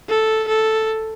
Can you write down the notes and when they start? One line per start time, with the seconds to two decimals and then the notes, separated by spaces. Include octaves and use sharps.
0.09 A4
0.48 A4